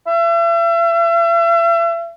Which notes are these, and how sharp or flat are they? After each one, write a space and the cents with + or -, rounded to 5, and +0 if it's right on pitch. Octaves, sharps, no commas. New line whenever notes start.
E5 +40